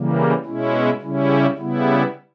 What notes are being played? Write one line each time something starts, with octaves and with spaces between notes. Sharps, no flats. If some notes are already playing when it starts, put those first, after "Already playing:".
Already playing: C#3 E3 G3 A#3
B2 G#3 C#4 E4
C#3 G3 C#4 E4
C#3 G3 B3 E4